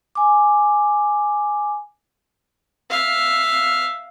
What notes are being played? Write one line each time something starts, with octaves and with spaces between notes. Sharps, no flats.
G#5 D6
E5 F5